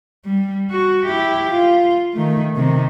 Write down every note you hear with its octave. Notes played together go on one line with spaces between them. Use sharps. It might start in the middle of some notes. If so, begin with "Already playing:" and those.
G3
F#4
E4 G4
F4
D#3 A3
C3 D#3